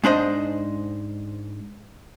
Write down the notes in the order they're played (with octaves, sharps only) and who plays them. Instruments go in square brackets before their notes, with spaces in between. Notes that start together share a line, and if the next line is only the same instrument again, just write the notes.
[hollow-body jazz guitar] G#2 D4 C5 D#5